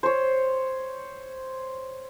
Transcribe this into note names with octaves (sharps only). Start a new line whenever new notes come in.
C5 C#5